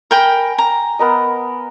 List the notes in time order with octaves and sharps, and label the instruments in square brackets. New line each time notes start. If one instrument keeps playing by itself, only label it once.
[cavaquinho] A#4 G5 B5 [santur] G#5
[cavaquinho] A#5
[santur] B3 A#4 D#5